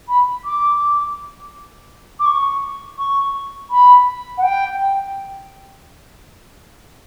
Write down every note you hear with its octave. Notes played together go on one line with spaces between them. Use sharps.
B5
D6
D6
C#6
C#6
B5
F#5
G5